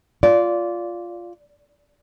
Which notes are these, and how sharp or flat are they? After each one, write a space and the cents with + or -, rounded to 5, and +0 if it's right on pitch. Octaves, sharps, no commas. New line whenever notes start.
F4 +0 D5 -20